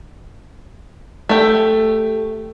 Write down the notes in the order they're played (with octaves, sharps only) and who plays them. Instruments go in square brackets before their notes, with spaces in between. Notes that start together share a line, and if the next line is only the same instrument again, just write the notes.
[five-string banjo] A3 G4